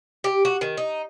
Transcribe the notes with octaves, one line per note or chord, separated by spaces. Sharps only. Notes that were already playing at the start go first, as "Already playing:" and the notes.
G4
F#4
D#3
D#4